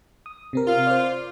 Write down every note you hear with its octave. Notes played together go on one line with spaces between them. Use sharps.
D#6
C3 C4 A#4
F4
C5 D5